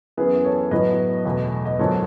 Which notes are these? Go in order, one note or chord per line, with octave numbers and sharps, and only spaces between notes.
F#2 E3 B3 G#4 B4
A4 C#5
A2 F#3 B3 B4 D#5
E2 B2 A3
D#5
G#2 D#3 F#3 A4 C#5